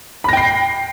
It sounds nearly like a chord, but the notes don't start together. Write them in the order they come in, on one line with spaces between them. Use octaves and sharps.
B5 A#6 G5 C7